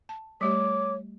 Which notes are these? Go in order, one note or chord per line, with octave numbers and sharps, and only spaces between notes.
A5
G3 A3 G4 C#5 D6